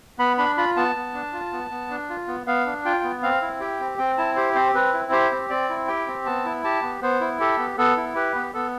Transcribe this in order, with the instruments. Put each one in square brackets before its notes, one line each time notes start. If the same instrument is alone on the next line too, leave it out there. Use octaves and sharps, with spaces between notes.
[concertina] B3 B5
D4 B5
F4 B5
B3 A5
B3
D4
F4
B3
B3
D4
F4
B3
B3 F5
D4
F4 G5
B3
C4 F5
E4
G4 G5
C4
C4 G5
E4 A5
G4 C5
C4 C5
C4 B4
E4
G4 C5
C4
C4 D5
E4
G4 G5
C4
B3 A5
E4
G4 A5
B3
B3 C5
E4
G4 A4
B3
B3 A4
E4
G4 B4
B3
B3 A4